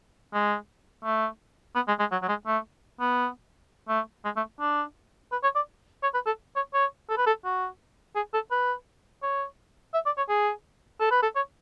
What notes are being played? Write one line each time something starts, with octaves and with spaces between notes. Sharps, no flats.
G#3
A3
B3
G#3
G#3
F#3
F#3
G#3
A3
B3
A3
G#3
A3
D4
B4
C#5
D5
C#5
B4
A4
C#5
C#5
A4
B4
A4
F#4
G#4
A4
B4
C#5
E5
D5
C#5
G#4
A4
B4
A4
C#5